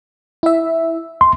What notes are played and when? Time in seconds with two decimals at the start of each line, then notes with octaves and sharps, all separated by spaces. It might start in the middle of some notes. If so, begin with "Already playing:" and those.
0.43 E4 E5
1.21 C6